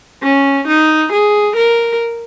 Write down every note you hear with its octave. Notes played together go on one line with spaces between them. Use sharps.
C#4
D#4
G#4
A#4